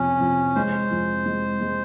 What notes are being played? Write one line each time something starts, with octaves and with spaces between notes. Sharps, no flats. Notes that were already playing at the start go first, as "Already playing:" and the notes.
Already playing: F2 C3 C#4
F2
G#3 C5
F2
G#3
G#3